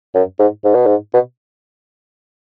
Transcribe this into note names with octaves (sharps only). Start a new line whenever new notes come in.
F#2
G#2
G#2
B2
G#2
B2